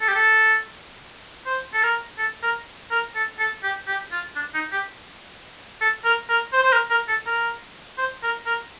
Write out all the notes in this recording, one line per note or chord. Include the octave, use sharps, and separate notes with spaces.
A4
G4
A4
C5
A4
A#4
A4
A#4
A#4
A4
A4
G4
G4
F4
D4
D#4
G4
A4
A#4
A#4
C5
C5
A#4
A#4
A4
A#4
C5
A#4
A#4